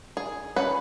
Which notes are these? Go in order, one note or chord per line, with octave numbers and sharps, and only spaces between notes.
G#4
C#4 B4 F#5